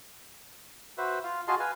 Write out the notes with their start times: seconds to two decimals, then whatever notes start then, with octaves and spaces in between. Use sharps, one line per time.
0.98 F#4 B4 C5 E5
1.24 F4 F5
1.48 F4 F#4 G#4 D#5 A5 C6
1.59 B4 F5 G#5